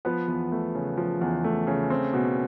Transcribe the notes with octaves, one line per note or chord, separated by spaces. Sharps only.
F3 B3 B4
E2
A3
C#3
F3
E2
A3
C#3
C4
B2